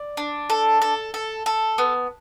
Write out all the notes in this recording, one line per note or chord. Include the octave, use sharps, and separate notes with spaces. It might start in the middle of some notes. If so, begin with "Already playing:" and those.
Already playing: D5
D4
A4
A4
A4
A4
B3